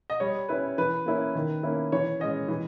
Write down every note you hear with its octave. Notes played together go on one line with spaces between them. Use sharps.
D#5
G3 C#5
C#4 E4 B4
E3 B4
A#3 C#4 E4
D#3
A#3 C#4 E4
E3 C#5
G#3 C#4 D#5
E3